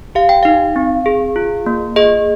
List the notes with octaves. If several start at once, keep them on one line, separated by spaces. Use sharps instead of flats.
G4 F5
G5
D#4 F5
C4
G#4
F4
A#3
G#4 D#5